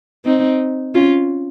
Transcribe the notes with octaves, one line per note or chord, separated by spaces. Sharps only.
C4 D#4
C#4 F4